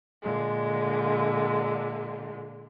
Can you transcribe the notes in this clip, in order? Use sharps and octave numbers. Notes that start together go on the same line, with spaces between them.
A#2 D3 G#3